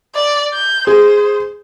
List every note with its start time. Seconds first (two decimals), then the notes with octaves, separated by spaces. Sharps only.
0.15 D5
0.54 G6
0.87 G#4 C5